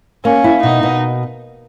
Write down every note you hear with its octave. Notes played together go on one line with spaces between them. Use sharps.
A#3 C#4
E4
B2 D#4
B2